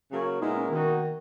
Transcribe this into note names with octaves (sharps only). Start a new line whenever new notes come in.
C#3 F#3 A#3 C#4
A#2 G#3 B3 D#4 E4 A#4
C#4
B2 D#3 A#3 D#4 F#4